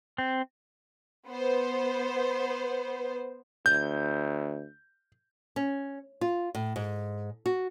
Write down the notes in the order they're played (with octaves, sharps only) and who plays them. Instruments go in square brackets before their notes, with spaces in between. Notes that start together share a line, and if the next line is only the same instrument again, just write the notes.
[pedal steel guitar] C4
[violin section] B3 C5
[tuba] D2 [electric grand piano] G6
[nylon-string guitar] C#4
F4
A2
G#2
F#4